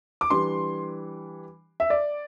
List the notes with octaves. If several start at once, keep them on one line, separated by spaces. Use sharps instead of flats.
D6
E3 G3 D4 C6
E5
D5